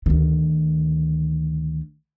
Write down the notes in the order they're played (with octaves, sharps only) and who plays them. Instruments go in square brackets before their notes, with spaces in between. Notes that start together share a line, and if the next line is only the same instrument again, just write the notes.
[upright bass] D2 D#3